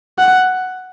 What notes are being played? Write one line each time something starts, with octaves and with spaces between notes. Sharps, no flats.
F#5